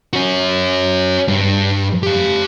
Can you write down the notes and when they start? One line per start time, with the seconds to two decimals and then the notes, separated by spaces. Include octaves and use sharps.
0.13 C#4 F#4
1.28 G2
2.03 G4 F5